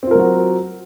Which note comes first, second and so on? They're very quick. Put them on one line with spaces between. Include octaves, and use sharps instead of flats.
C4 F4 A#4 F#3 F#4